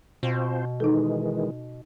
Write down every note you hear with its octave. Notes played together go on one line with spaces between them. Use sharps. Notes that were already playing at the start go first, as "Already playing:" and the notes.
B2 C4 F4 C5
D#3 E3 G#3 D#4 A4